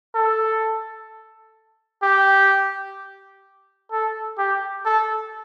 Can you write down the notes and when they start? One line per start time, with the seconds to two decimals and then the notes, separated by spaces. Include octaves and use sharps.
0.15 A4
2.03 G4
3.91 A4
4.38 G4
4.85 A4